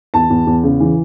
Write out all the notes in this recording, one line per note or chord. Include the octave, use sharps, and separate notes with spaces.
E2 A5
E2
E2
C#3
E3